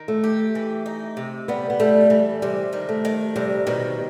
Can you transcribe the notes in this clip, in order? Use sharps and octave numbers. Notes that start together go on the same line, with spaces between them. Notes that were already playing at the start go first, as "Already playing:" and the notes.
Already playing: D#3
A3
G4
E3
D#4
C3
G3 B3
B3
G3 A3
E3 G3
C3 G3
D#3
A3
D#3
C3 G3
B2 D#3